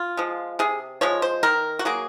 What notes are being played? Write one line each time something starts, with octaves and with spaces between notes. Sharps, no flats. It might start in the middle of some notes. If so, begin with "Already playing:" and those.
Already playing: F4
F3 G#3
C3 G#4
F3 G#3 C#5
C5
D#3 A#4
F#4
F#3 A#3 G#4